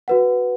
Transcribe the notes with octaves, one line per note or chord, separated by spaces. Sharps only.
F#4 B4 F#5